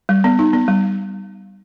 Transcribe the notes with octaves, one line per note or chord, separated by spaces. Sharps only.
G3
B3
D#4
B3
G3